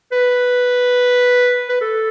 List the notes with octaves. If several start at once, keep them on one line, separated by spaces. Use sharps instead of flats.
B4
B4
A4